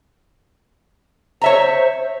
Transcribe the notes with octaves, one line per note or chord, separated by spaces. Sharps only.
C5 C#5 E5 A#5